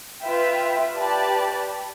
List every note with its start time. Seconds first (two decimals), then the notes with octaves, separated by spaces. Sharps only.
0.23 F4 B4 E5 G5
0.95 G4 B4 D5 A5